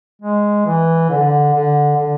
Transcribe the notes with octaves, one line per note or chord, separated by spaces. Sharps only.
G#3
E3
D3
D3
D3